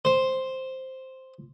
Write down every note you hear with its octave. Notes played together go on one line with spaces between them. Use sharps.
C5